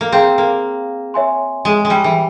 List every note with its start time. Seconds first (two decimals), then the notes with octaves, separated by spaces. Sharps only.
0.01 A#3
0.12 C4 G#4 C5 F5 A#5
0.38 A#3
1.14 C#5 E5 G#5 C6
1.65 G#3
1.85 G#3
1.90 G3
2.04 E3